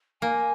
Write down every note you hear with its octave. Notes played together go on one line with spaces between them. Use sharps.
A#3 G#5